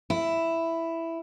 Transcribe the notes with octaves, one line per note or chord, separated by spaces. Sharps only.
E4